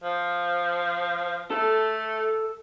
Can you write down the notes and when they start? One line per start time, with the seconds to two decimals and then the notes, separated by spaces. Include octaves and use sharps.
0.03 F3
1.51 A3 A4